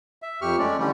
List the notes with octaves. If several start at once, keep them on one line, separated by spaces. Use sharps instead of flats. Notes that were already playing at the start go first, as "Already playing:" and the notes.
E5
F2 G4 C#6 F6
G#3 A3 C#4 D5
D3 E3 G3 C#4 G4